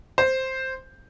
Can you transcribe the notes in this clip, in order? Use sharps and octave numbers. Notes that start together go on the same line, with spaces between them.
C5